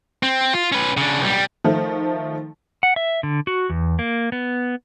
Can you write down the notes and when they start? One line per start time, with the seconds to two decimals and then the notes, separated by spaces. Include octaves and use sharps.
0.23 C4
0.53 F4
0.72 C#4 B4
0.97 C#3 D4
1.21 B1 G3
1.64 D#3 F3 A3
2.83 F#5
2.96 E5
3.23 D3
3.47 F#4
3.70 E2
3.99 A#3
4.32 B3